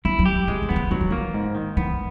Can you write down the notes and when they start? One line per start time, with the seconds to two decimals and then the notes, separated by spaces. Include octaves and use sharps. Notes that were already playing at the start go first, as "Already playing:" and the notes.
0.05 F#3 E4
0.19 F#3
0.25 G4
0.48 F3 G#3
0.62 F#3
0.69 E3 B3
0.76 F3
0.91 E3 F#3
1.01 F3
1.10 E3 A#3
1.34 G#2
1.55 D#3
1.77 E3 B3